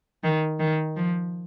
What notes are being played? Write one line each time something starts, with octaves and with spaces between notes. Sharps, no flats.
D#3
D#3
F3